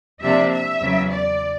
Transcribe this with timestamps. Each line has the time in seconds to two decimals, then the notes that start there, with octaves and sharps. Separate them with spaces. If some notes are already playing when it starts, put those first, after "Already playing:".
0.21 C3 F3 A#3 D4 E5
0.50 E5
0.80 E2 C#3 F#3
1.09 D5